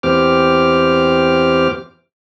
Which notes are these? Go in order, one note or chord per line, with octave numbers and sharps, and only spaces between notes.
E2 C4 G4 D6 F6